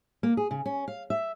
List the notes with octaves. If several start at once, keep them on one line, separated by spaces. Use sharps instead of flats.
A#3
G#4
C#3
C#4
F5
E5